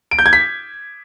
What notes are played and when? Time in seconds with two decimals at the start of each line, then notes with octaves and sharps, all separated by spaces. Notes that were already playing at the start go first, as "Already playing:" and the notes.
0.11 D7
0.19 G6
0.26 G#6
0.33 B6